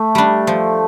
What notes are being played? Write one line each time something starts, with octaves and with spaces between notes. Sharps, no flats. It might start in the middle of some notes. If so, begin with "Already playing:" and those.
Already playing: A3
G3 D4
F3